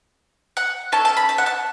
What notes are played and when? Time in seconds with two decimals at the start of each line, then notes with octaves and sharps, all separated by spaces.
0.57 F#5
0.92 C#4 A4 A5
1.05 A5
1.17 B5
1.29 A5
1.38 F#5
1.46 A5